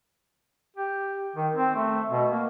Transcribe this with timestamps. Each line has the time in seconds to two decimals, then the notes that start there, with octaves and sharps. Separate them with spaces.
0.76 G4
1.36 D#3
1.56 C4
1.75 A3
2.11 B2
2.32 A#3